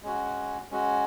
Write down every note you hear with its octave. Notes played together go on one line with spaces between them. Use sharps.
G#3 C#4 F#4
G#3 C#4 F#4